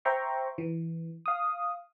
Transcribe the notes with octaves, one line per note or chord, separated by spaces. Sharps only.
C5 E5 G5 A#5 C6 C#6
E3
F5 D#6